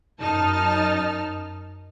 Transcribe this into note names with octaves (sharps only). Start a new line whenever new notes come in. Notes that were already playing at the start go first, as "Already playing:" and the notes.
F#2 D#4 A5 F6